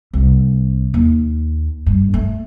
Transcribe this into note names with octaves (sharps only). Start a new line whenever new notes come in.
C2
D#2
G2
A3